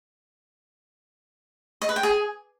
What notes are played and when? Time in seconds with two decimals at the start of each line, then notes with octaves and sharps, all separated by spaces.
1.82 D#5
1.89 B4
1.96 G5
2.03 G#4